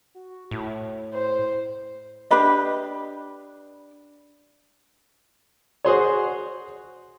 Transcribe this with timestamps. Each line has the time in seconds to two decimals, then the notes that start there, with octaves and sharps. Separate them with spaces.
0.15 F#4
0.51 A2 E4
1.13 C5
2.31 D4 G4 B4 D#5
5.85 F#4 G#4 C5 C#5